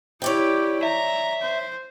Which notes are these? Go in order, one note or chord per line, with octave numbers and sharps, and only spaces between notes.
E4 G4 C#5 D5 G5
E5 A#5
C5